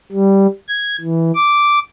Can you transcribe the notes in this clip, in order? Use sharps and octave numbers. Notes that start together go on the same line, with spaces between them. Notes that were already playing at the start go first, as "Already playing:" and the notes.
G3
G#6
E3
D6